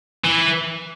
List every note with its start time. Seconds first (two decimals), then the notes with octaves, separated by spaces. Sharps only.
0.25 E3